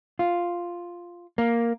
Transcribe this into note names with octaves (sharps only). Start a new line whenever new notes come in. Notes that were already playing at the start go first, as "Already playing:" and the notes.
F4
A#3